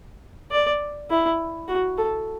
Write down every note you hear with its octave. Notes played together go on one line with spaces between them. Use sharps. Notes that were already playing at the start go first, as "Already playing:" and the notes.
D5
E4
F#4
A4